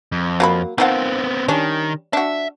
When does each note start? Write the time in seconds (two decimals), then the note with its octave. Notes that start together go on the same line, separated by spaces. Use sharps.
0.12 F2
0.40 F#3 A#3 B5
0.78 D#3 F3 B3 C4 F#5
1.48 D#3 G3 C#4 D4
2.13 D4 F#4 E5